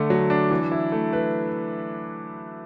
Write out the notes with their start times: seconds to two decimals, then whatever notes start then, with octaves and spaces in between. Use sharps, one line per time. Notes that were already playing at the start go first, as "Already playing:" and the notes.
Already playing: D3 A3
0.10 F#3
0.30 D4
0.51 E3
0.71 E4
0.92 A3
1.13 B4